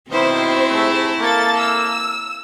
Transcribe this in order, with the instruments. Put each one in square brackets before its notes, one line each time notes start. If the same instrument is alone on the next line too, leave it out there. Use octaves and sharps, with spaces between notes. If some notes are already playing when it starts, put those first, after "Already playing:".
[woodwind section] B2 D#3 [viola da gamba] C4 E4 [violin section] C5
[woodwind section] G#2 C3 A3
[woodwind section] A#3 [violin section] A4 A6
[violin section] E6